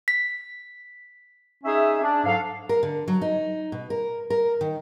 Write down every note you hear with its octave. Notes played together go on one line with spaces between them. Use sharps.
B6
C#4 D#4 G#4 E5
D4
G#2 F#3 A4 F5
A#4
D3
F#3
D#4
B2
A#4
A#4
D#3